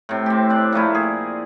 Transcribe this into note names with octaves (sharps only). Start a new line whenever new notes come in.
A2 C3
C4 G4
D4 D5
A#2 F3 A3 E4
G#4